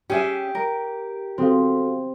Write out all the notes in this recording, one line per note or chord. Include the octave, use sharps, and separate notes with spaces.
C#4 G4 G#4 E5
A#4
C4 F#4 A4 F5